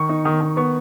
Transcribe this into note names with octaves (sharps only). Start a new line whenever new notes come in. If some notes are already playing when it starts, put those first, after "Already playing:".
Already playing: D#3 C#6
D#4
D#3 D#6
D#3
B3 C#6